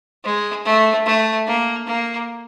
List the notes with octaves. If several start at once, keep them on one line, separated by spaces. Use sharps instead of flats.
G#3
A3
A3
A#3
A#3